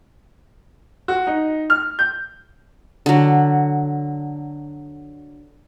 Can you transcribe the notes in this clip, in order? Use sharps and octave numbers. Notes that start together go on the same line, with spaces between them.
F#4
D#4
F6
G6
D3 F#3